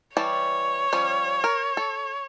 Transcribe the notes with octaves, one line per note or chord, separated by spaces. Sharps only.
E3 G3 C#5 A5
F3 G3 C#4
A#4
A4